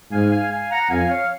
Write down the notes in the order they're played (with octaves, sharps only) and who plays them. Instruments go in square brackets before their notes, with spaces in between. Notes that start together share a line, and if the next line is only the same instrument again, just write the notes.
[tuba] G#2 [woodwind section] F5 G#5
[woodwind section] F5 G#5
F5 G#5
F#5 A#5
[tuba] F2 [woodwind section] F5 G#5
[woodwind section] C#5 F5